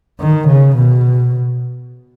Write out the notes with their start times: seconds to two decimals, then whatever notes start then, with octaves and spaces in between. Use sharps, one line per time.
0.20 D#3
0.48 C#3
0.76 B2